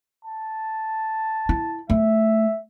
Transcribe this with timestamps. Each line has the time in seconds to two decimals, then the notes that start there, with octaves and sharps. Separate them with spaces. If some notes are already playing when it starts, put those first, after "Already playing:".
0.25 A5
1.49 E4
1.90 A3 E5